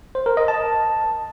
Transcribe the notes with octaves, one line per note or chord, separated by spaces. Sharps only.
C5
A#4
D#5
A5